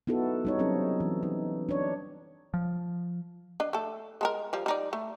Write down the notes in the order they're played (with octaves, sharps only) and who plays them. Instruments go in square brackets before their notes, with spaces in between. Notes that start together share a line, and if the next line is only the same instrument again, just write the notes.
[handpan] B3 D#4 E4 F#4 A4
G3 D#4 C#5
F#3 C4 C#4 A4
E3
D#4
D4 C#5
[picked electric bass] F3
[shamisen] D4 D#5
A3 A4
G#3 A4 A#4
F3 G3
G3 D#4 D5
A3